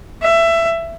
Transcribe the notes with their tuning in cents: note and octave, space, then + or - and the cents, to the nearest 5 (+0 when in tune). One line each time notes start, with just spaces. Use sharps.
E5 +15